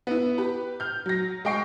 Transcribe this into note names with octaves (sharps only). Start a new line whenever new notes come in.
B3 E4
G4 B4
F6 G6
F#3 A#6
G#3 D#5 G5 C#6 C7